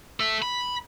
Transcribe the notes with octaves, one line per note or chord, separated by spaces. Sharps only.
A4 E5
B5